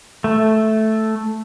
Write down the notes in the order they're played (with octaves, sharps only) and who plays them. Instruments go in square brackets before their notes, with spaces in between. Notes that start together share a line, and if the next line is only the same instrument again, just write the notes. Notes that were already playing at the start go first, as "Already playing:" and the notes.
[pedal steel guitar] A3